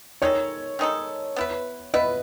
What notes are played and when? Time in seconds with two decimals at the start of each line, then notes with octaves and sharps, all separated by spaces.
0.22 D#3 G#3 D#4 A4 C#5
0.79 D#3 G#3 D#4 A4
1.36 B3 E4 B4
1.94 B3 E4 B4 D#5